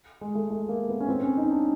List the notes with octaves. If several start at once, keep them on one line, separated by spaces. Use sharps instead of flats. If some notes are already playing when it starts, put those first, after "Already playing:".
G#3
A3
A3
A#3
B3
C#4
C4
C#4
D#4
D4